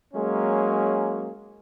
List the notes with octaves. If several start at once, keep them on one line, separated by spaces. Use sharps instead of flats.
F#3 G#3 A#3 C#4